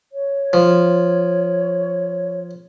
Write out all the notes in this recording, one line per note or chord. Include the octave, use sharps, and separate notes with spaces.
C#5
F3